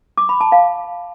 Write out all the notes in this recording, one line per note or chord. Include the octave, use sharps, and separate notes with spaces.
D6
B5
A5
F5